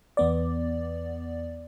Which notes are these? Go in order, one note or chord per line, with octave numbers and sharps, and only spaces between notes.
E2 B3 D5